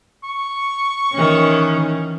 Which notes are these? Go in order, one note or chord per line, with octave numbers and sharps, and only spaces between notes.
C#6
D#3 E3 C#4